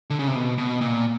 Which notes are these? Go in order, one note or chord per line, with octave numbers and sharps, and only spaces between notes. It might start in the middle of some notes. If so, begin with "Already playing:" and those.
D3
C#3
C3
B2
B2
A#2